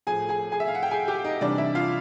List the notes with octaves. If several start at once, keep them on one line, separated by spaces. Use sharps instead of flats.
A2 F3 G#4 G#5
G#4 G#5
G#4 G#5
E5
F5
F#5
G5
G#4 G#5
G4 G5
D#4 D#5
C3 E3 G3 D4 D5
E4 E5
F4 F5